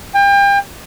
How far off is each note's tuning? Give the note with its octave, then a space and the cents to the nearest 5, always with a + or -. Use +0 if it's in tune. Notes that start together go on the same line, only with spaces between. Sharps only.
G5 +35